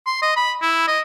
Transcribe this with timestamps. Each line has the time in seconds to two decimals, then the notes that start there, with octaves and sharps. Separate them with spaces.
0.06 C6
0.22 D#5
0.36 B5
0.62 E4
0.88 D#5